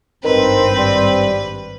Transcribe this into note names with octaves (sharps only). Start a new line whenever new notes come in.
G#1 G2 D#3 C4 B4
G3